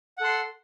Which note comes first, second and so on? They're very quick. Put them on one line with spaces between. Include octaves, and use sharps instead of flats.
F#5 A4 C6